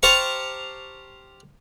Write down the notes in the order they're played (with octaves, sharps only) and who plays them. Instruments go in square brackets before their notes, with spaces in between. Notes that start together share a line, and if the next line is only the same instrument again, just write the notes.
[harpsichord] G4 C5 F5 A5 A#5 C#6